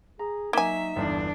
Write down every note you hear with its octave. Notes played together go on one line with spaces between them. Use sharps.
G#4 A#5
F#3 A#3 D#4 E5 G#5
G1 E2 D4